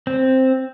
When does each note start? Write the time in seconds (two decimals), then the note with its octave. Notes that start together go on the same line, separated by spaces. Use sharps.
0.07 C4